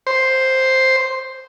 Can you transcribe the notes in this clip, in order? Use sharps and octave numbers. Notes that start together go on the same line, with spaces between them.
C5